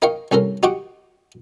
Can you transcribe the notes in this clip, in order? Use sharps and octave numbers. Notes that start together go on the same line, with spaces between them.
D#4 A#4 D#5 F5 G5 C#6
C2 C#4 A4 A#4
D#4 F#4 G4 F#5 C#6 D6